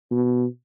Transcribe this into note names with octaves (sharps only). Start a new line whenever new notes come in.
B2